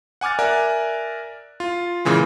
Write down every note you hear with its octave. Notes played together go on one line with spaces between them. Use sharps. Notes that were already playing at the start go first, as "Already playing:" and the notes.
F#5 G#5 D6 F6 A6
A#4 D5 E5 G#5 F#6
F4
A#2 C#3 E3 G#3